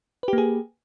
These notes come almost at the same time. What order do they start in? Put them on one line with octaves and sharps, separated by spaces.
B4 G4 A#3 G#4